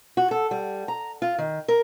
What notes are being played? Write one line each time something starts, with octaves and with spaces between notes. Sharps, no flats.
F#4
A4
G3
A#5
F4
D#3
A#4